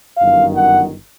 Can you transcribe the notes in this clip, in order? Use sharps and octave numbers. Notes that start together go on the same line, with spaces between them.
G1 F#2 D#3 F5
F#5